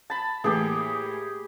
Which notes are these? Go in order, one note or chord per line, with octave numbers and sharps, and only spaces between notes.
A5 B5
A2 E3 A#3 G4 G#4